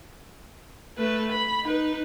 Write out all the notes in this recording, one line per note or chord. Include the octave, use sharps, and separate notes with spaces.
A3 B4
B5
D#4 B4